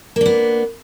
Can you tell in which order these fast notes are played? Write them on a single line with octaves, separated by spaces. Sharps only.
A#3 D4 B3